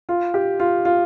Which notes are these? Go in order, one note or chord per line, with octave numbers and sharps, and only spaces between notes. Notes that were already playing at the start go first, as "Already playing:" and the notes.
F4
G4
F4
F4